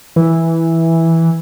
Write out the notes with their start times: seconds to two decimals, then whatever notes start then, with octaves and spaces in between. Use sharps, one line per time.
0.16 E3